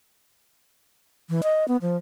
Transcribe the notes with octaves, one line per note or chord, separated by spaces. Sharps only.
E3
D#5
B3
F3